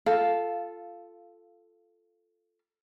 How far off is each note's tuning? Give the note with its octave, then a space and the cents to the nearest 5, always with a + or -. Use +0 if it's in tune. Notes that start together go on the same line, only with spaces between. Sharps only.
F4 -10 A4 +0 F5 +0